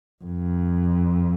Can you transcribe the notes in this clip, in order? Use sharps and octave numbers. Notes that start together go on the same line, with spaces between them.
F2